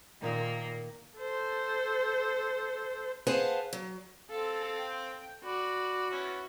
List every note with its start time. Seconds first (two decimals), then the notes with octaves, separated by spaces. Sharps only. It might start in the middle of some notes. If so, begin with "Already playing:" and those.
0.22 A#2 D#3 A#3 D#4 A#4
1.18 A4 C5
3.27 G#4 B4 C5 F5 F#5 A5
3.73 F#3
4.30 C4 A4 F5
4.78 G5
5.44 F#4 D5 B5
6.11 B3 C#4 E4